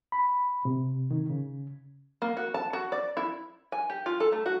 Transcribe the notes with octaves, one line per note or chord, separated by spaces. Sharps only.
B5
C3
D#3
C#3
A#3
F#4
A5
F#4
D5
E4
G#5
G4
F4
A4
A3
F#4